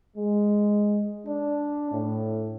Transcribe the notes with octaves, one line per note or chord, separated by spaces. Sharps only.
G#3
D4
A2